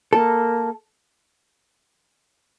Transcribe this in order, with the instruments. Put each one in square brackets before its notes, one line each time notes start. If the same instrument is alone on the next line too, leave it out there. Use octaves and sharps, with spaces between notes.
[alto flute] A#3 [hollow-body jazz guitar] A4